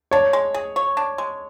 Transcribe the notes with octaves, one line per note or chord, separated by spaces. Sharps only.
D4 C#5
G#3
G#4
C#5
D4
G#3